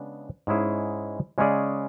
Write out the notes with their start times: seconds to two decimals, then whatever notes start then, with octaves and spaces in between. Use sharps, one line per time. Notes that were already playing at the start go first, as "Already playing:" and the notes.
Already playing: C#3 G#3 B3 D4
0.47 G#2 G#3 C#4 E4 G#4
1.38 C#3 G#3 C#4 G#4 D5